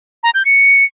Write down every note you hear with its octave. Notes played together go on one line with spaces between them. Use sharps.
A#5
G6
C#7